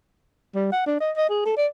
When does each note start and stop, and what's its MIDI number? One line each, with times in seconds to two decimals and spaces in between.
0.54 0.71 55
0.72 0.82 78
0.86 0.96 62
1.00 1.11 75
1.17 1.26 75
1.29 1.41 68
1.46 1.54 69
1.57 1.67 74